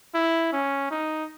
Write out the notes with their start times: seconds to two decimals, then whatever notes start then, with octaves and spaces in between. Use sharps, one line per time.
0.15 E4
0.52 C#4
0.91 D#4